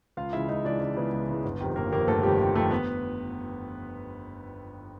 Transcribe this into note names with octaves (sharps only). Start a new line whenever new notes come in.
C#2 F4 F5
C#3 E3 G#3 E4 E5
C#2 D#4 D#5
C#3 E3 G#3 D4 D5
C#2
C#3 E3 G#3 B3 B4
C#2
C#3 E3 G#3
G1
F2 C3 D#3
G1 A#3 A#4
F2 C3 D#3 A#3 A#4
G1 A3 A4
F2 C3 D#3 G3 G4
G1
F2 C3 D#3 A3 A4
B3 B4